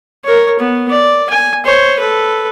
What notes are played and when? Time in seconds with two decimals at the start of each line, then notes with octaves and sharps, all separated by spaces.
0.25 A#4 C#5
0.59 B3
0.90 D5
1.30 G#5
1.65 C5 C#5
2.00 A4 B4